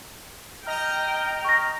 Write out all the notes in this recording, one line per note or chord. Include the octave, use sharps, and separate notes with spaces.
D#5 G5 A#5 F6
C#6 A#6